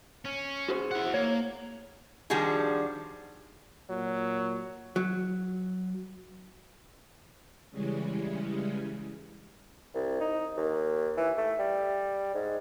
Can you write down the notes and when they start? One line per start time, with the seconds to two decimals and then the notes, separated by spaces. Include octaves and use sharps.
0.25 C#4
0.69 F#4 G#4 C5
0.92 E4 F#5
1.14 A#3 C#5
2.30 D#3 F3 G3 D4 F#4 G#4
3.90 A#2 F#3
4.96 F#3
7.70 C#3 E3 G3 G#3 C#4
9.95 C2
10.20 D#4
10.57 D#2
11.17 E3
11.37 A3
11.59 G3
12.34 G#2